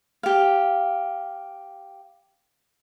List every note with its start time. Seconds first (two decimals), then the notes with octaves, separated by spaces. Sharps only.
0.23 G4 F5